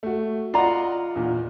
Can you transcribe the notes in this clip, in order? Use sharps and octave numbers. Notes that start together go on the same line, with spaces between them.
A3 F#4
F4 D5 D#5 F#5 A#5
E2 A#2